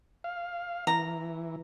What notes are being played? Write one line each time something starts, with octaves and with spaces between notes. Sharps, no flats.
F5
E3 A#5